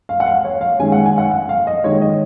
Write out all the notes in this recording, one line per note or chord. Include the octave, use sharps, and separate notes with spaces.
F5
F#5
F5
C#5
F5
D#3 G#3 C#4 G#5
F#5
G#5
F#5
F#5
F5
D#5
D#3 G#3 D#4 C#5
D#5